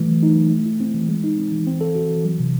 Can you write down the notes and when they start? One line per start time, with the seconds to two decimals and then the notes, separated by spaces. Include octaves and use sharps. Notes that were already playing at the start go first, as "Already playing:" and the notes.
Already playing: E3 A3
0.08 F#3
0.23 D#4
0.36 F#3
0.51 A3
0.66 E4
0.80 C4
0.94 E3
1.09 G#3
1.24 D#4
1.38 C4
1.52 E3
1.67 C4
1.81 A4
1.95 F#4
2.09 E3
2.25 F#3
2.39 C3